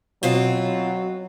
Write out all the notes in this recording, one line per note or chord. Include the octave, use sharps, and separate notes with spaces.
B2 F#3 C4 F4